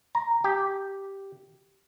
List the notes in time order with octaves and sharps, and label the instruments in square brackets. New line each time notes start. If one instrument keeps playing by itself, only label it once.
[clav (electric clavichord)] A#5
G4